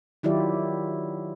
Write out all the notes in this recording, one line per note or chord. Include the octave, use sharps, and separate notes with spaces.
D#3 F#3 E4 F4 G4 D5